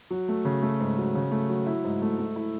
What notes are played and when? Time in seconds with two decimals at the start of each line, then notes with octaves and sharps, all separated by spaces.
0.11 F#3
0.29 A3
0.45 C#3
0.62 A3
0.80 G#2
0.98 F#3
1.15 C#3
1.31 A3
1.49 F#3
1.66 E4
1.84 G#2
2.02 A3
2.19 A3
2.36 E4